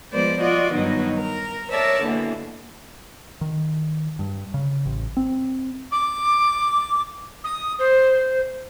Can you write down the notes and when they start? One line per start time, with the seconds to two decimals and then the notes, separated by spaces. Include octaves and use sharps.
0.12 F3 G#3 B3 C5 D5
0.41 F4 F#4 D5 D#5
0.73 G2 B2 D#3 F#3 D#4
1.17 A#4
1.70 A#4 C#5 D5 E5 A5
2.04 B2 D3 E3 A#3
3.41 D#3
4.19 G2
4.54 C#3
4.86 A1
5.17 C4
5.91 D6
7.44 D#6
7.79 C5